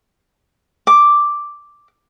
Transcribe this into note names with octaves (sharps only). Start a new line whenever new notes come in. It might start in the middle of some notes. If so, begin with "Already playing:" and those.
D6